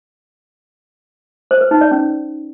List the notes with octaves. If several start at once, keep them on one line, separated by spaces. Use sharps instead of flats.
C5
B4
D#4
D5
C#4